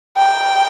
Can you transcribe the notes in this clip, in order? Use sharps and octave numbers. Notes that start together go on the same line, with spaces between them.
G5